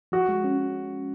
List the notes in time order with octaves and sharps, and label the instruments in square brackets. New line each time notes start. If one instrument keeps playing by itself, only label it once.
[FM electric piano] F3 [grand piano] F#4
[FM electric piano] G#3
C#4